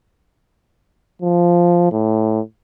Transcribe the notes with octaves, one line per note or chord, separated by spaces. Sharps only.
F3
A2